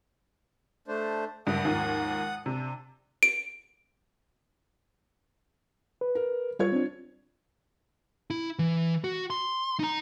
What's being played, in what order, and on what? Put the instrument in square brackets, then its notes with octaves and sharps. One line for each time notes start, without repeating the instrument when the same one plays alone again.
[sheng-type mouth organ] A3 D4 C5
[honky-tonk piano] F#1 G2 [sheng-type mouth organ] F#5 D#6
[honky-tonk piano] D#2 G#2 F3
[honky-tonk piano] C3 [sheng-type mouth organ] D4
[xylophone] D7
[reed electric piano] B4
[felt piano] A#4
[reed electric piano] G3 [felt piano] F4 C#5 G#6
[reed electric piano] C4 D4
[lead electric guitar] E4
E3
F#4
C6
D#4 A#5